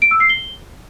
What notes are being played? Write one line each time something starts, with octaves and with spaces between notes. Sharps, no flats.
D7
E6
C7
G7